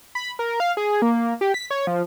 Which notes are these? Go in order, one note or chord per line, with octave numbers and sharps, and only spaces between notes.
B5
A#4
F5
G#4
A#3
G4
B6
C#5
F3